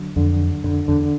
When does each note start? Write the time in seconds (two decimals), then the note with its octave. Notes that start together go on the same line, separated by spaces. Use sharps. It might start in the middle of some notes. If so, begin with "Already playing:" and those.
Already playing: D3 F#3
0.16 F2 D3
0.40 D#2
0.64 F2 D3
0.88 E2 D3